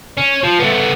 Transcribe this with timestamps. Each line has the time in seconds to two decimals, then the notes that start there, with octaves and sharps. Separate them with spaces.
0.17 C#4
0.43 F3
0.60 A3 B3